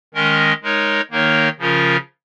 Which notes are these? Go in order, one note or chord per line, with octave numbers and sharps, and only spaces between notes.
D#3 G#3 C#4 A#4 D#5
G#3 D#4 A#4 C#5
D#3 A#3 D#4 A#4 C#5
C#3 F3 C#4 F4 A#4